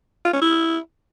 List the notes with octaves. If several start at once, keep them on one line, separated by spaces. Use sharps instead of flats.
F4
C#4
E4